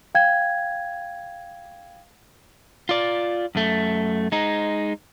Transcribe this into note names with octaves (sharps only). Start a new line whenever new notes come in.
F5 G5 G#6
F4 D5
F#2 A3
G#3 D#4